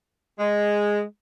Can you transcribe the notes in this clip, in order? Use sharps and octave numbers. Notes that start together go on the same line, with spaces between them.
G#3